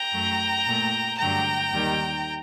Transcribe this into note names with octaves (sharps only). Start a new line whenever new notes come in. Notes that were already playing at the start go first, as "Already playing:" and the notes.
Already playing: G5 A#5
F#2 F#3 A3
A#2 A3
G2 D3 F#3 A3 G5 A#5
D#2 D#3 G3